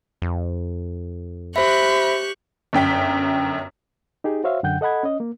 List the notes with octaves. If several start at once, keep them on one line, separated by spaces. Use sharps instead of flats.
F2
G4 C5 E5 B5 C#6 F#6
G1 F#2 G5 B6
D#4 G4 G#4
F#4 C5 C#5 E5 F5
F#2 D3 F#5 G5 G6
A4 D#5 F#5 B5 G#6
C#4 D#5
A#3